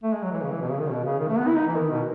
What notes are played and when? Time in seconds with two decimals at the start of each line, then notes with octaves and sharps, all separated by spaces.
0.03 A3
0.13 G#3
0.23 F#3
0.32 E3
0.42 C#3
0.52 E3
0.61 B2
0.70 C#3
0.80 D#3
0.90 B2
1.05 C#3
1.19 D#3
1.29 A3
1.38 B3
1.48 E4
1.57 D#4
1.67 E3
1.77 D#3
1.91 B2